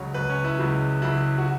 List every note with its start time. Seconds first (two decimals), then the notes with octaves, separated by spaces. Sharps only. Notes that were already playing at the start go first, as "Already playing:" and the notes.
Already playing: C#2 C#3 F#3 C#5
0.14 C#2 C#3 F#3 B4
0.30 C#4
0.44 E4
0.59 C#2 C#3 F#3
1.02 C#2 C#3 F#3 E4
1.38 F#4